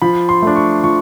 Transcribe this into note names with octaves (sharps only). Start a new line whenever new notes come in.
F3 B5
C6
A3 D4
C#6
F3 C#6